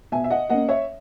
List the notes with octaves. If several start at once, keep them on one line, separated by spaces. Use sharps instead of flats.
B2 E5 G#5
E5
D#5 F#5
A#3 C#4 D#5 F#5
C#5 E5